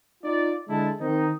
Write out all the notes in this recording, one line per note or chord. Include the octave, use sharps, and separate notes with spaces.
D#4 F4 D5
D3 G#3 E4 A5
D#3 C4 D#4